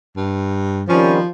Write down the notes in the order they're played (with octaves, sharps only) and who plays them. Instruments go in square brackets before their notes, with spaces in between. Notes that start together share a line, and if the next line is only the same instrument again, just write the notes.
[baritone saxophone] G2
[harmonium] C3 D#3 G3 [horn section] F3 [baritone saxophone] C#4